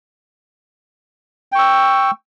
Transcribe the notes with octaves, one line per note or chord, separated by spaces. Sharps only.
G5 C#6 E6